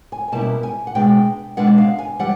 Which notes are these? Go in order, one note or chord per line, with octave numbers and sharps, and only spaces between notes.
G#5
G#5
B2 G3 A#3 C#4 E4 A5
G#5
F#5
B2 G#3 B3 D4 G5
B2 G#3 B3 D4 F#5
F5
G#5
E3 G3 F#5